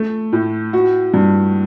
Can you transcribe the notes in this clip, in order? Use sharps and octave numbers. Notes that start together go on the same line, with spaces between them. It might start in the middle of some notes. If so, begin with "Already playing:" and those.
Already playing: A3
A2
F#4
G2